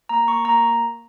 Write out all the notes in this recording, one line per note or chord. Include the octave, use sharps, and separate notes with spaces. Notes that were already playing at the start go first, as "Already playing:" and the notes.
A#3 A#5
A#3 C#6
A#3 A#5